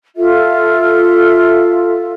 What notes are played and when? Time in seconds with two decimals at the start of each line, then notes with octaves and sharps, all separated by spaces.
0.16 F4 A4 E5